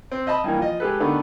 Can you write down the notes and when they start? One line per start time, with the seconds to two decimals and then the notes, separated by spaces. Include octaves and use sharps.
0.12 C4
0.27 D#5 E5 A5 B5 D#6
0.44 G2 E3 A#3
0.58 F3 D#5
0.80 G#3 G4 A4 B4
1.00 D3 D#3 A3 B3 D4